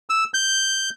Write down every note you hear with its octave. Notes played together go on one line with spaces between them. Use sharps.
E6
G6